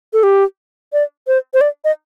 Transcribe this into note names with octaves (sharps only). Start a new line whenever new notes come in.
A4
G4
D5
C5
C5
D5
D#5